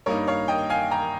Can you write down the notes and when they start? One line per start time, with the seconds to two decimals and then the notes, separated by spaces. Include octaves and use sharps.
0.06 G2 G3 A#3 D#4 A#4 C#5
0.27 C#5 F5
0.48 D#5 G5
0.70 F5 G#5
0.91 G5 A#5